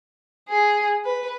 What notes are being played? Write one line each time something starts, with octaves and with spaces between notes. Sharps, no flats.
G#4
B4